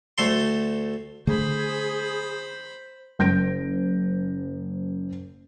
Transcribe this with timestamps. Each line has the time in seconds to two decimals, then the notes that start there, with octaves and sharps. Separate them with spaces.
0.18 D2 A3 A4 C6
1.27 D3 A3 G#4 C5 B5
3.19 F#1 G6 A#6 D7